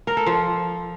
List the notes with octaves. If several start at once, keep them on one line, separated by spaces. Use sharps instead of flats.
A#4
A4
F3